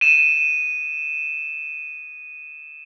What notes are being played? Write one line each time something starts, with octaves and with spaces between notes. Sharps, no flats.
D#7 E7